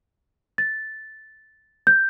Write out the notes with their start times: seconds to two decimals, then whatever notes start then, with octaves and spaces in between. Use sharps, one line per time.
0.58 A6
1.87 G6